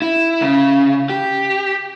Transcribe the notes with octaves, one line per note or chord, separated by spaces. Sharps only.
E4
C#3
G4